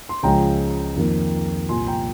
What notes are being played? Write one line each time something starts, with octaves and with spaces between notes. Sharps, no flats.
C6
C#2 C#3 F3 G#3 G5 A#5
F2 D#3 A#3
C2 A#2 F3 G#5 C6
G5 A#5